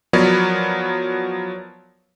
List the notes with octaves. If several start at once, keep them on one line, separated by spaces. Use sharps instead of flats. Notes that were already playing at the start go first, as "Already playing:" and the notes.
F3 F#3 B3 A#4 C#5 D5